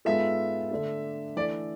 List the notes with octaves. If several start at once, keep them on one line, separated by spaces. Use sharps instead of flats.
G#2 G#3 B3 F4 A4 E5
D3 A3 D4 A4
E3 A3 D4 A4 D5